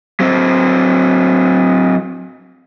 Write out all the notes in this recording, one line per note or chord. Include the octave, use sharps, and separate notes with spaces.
F#3 C4